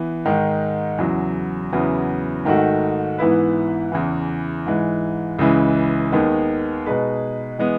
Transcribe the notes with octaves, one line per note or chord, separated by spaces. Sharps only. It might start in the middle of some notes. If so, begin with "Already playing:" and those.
Already playing: E3 B3
G#2 D#3 G#3 D#4
E2 C#3 F#3
E2 C#3 F#3 B3 E4
G#2 D#3 A3 D#4 F#4
G#2 E3 B3 E4 B4
E2 C#3 E3
G#2 E3 G#3
C#2 C#3 E3 G#3
D#2 D#3 G#3 B3
B2 G#3 D#4 G#4 B4
E3 G#3 B3